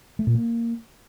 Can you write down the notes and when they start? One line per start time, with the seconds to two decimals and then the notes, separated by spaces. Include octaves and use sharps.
0.19 A3
0.27 A#2
0.35 A#3